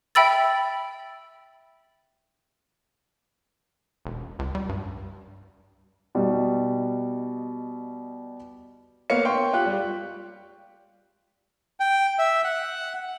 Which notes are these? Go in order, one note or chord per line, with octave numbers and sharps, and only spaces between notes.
E5 G5 B5 E6 A6
E1
C#2
G3
G2
B2 G3 D#4
A#3 B3 C#5 F5 C#7
G5 C6 C#6
F4 G4 F#6
G3
G5
E5
F#5